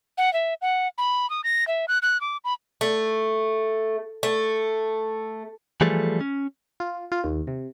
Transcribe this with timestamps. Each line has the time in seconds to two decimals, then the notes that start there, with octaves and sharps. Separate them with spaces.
0.18 F#5
0.33 E5
0.62 F#5
0.98 B5
1.30 D#6
1.44 A#6
1.68 E5
1.88 F#6
2.02 F#6
2.21 D6
2.44 B5
2.81 A3
4.23 A3
5.81 E3 F3 G3 A3 G#4 A4
6.21 C#4
6.80 F4
7.12 F4
7.24 D#2
7.47 C3